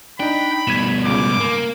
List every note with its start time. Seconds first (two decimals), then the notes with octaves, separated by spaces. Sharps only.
0.20 D4 D#4 G5 B5
0.67 G2 B2 G#6 D#7 E7
1.05 C#2 C#3 D6
1.40 A#3